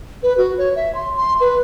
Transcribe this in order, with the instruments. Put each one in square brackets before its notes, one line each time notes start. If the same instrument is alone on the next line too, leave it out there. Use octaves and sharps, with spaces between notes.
[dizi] B4
F#4
C#5
E5
C6
C6
B4